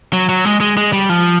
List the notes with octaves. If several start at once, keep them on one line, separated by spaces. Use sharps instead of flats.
F#3
F#3
G#3
G#3
G#3
G3
F3